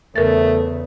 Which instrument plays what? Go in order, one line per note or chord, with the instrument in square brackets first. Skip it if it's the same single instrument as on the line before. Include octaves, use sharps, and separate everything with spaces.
[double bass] E2 C#3 [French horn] A3 [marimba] A#4 A6